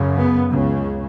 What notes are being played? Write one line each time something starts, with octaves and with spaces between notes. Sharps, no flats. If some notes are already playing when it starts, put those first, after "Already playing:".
Already playing: F#2 C#3
B3
C#2 C#3